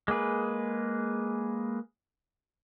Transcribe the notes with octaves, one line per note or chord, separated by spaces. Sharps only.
G#3 A#3 G#4 B4